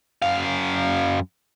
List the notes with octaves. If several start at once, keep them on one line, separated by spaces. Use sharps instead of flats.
F#2 F5